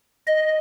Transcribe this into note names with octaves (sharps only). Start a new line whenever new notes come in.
D#5